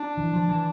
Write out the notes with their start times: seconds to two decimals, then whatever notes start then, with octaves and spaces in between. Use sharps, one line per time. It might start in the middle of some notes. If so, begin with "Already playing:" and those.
Already playing: D4
0.17 E3
0.33 F3
0.49 E3